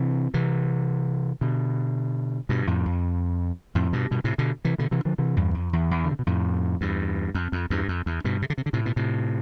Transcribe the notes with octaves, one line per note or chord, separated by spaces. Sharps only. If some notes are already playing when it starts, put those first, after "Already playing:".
Already playing: C3 E3
C3 E3
B2 D3
G2 B2
F2 A2
F2
F2 A2
G2 B2
G2 B2
A2 C3
B2 D3
C3 E3
B2 D3
C3 E3
D3 F3
C3 E3
E2 G2
F2
E2
E2
D3
C3
B2
F2 A2
E2 G2
F2
F2
E2 G2
F2
E2
G2 B2
C3
D3
C3
D3
A2 C3
B2
A2 C3